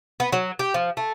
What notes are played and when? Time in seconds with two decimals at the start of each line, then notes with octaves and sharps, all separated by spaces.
0.20 B3
0.32 F#3
0.59 G4
0.74 F3
0.97 A3